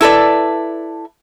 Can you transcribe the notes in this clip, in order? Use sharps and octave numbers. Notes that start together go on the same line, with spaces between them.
E4 A4 B4 D5